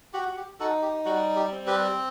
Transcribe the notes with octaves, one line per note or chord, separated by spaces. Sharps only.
F#4 G4
F#4
G4
D#4 F#4 A4
G4
G3 F#4
G4
C4
G4 B4